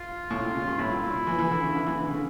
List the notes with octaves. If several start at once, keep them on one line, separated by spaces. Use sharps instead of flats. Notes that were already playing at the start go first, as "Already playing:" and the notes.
Already playing: F4
A2
A#2
C#3
G2
A2 E4
A#2
A#2
E3
E3
D3
C#3
D3
E3
D3
C#3